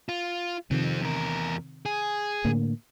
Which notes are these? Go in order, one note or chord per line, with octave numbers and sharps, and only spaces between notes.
F4
C3 D#3 F3 C4
E2 A#4
G#4
A2 D3 A#3